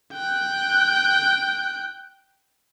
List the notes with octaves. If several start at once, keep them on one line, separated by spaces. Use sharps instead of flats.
G5 F#6